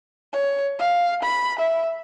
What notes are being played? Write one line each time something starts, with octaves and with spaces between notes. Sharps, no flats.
C#5
F5
B5
E5